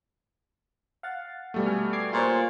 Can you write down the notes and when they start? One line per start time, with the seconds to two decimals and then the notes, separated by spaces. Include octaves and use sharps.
1.03 F5 F#5 A6
1.54 B2 G3 A3
1.66 G#5 F6
1.93 D6 G#6 C7
2.13 A#2 F4 C5 C#5